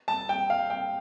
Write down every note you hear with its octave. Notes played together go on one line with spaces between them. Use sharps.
A5
G5
F5
G5